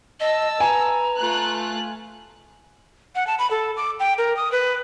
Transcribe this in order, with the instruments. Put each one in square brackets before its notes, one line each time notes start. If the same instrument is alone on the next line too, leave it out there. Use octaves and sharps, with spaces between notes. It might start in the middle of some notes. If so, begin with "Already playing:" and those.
[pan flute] D#5 [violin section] A5 E6
[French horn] B4 [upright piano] G#5 [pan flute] A#5
[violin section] A3 F4 F#6
[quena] F#5
A5
B5
A4
D6
G5
A#4
D#6
B4